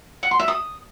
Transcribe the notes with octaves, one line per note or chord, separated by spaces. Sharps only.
F#5
C6
E5
D#6